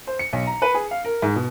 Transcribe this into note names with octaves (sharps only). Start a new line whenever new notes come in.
C5
C#7
B1
A#5
B4
G#4
F5
A#4
G#2
B2